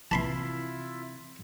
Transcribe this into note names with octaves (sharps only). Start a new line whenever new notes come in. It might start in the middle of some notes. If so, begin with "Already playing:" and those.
C3 E3 E4 F4 E5 A5 B5 C6